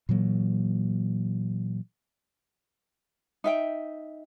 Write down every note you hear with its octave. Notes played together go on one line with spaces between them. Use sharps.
A#2 E3 F#3 A#3
D#4 E5 G5